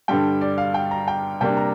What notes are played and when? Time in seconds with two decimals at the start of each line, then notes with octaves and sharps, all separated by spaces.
0.08 G2 D3 G3 G5
0.41 D5
0.58 F5
0.74 G5
0.91 A#5
1.08 G5
1.41 C3 G3 A#3 D4 G5
1.57 A#5